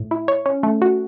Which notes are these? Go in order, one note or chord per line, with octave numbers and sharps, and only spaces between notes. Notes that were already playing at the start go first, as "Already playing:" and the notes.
Already playing: A2
E4
C#5
C#4
A3
F#4